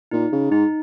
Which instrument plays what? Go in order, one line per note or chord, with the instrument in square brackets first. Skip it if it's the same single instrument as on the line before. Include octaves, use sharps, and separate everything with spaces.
[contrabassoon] A#2 [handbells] D#4
[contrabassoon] C#3
[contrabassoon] G#2 [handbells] D#4